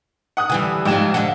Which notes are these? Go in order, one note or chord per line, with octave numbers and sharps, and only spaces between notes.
F#5 D#6 F#6
D3 E3 G3 G#5
G#2 F3 G#3 G4 E7
D3 D4 F#5